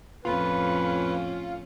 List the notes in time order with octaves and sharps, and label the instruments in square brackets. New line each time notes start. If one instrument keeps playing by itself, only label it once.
[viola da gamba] F2 A2 C#4 [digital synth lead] F4 [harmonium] B4